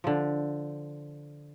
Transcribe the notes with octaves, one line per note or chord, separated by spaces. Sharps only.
D3 F3